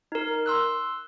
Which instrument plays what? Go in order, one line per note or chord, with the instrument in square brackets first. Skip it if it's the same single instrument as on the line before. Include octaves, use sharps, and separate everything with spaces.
[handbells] D#4 A#4
C6 E6 F#6